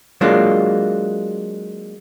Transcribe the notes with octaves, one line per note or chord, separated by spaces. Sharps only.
F#3 G#3 A#3 D4 F4